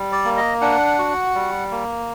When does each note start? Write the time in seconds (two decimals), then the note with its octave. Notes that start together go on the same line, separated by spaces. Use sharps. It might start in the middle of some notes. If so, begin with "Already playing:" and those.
Already playing: G3
0.12 D5
0.25 A#3
0.37 D#5
0.61 D4 F#5
0.98 F#4
1.35 G3
1.71 A#3